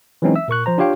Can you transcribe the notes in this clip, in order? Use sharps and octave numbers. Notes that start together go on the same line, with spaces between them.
E3 F#3 G#3 C4 C#4 D#4
E5 E6
A#2 A#4 C#6 F#6
F3 C5 A#5
D4 F4 G4 C#5 F5 G5